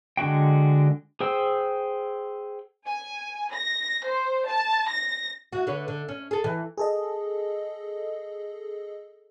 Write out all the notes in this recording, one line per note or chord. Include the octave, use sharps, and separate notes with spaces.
D3 G#3 F#4 G5
G#4 C5 G5 E6
G#5
A#6
C5
A5
A#6
E4 F#4
D3 B4 C#5
D3
C#4
G#4 A4
E3
G#4 A4 D#5